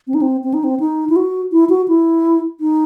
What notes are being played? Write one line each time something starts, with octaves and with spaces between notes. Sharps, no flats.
C4
D#4
C4
C4
D#4
C4
D#4
E4
F#4
E4
F#4
E4
D#4